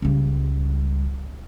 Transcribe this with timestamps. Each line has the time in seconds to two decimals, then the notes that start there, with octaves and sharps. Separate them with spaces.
0.02 C#2 G3